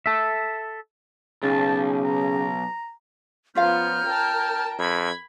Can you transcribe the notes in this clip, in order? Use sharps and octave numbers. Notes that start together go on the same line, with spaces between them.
A4 E5
B1 C#3 A5
A#5
F3 B3 C#4 F4 F5 A#5 F6 G6
A#4 G5 A5
F2 B5 G#6